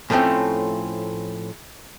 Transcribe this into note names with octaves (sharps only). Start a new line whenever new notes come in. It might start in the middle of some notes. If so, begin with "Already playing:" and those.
A2 F3 A3 C4 C#4